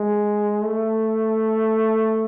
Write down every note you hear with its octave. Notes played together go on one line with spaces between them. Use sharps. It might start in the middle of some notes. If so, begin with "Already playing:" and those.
Already playing: G#3
A3